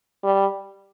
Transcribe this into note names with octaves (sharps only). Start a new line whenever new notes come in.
G3